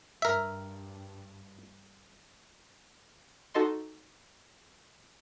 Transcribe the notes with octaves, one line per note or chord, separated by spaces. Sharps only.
G2 A#4 E5
D#4 F#4 A4 D#5 C6